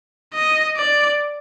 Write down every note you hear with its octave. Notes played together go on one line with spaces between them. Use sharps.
D#5
D5